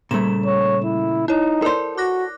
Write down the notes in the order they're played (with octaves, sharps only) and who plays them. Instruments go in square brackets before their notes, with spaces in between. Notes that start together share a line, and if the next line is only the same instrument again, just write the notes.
[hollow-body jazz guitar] A#2 C#3 A3 [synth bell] G3 E7
[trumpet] C#5
E4
[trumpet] D#4 [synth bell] E4 C#5
[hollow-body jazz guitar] A4 C5 [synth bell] A#4 D5
[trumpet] F#4 [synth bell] D6 F#6 A#6